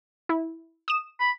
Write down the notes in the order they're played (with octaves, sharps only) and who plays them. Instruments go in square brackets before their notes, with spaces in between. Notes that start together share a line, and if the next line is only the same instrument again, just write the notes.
[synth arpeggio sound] E4
D#6 E7
[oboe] B5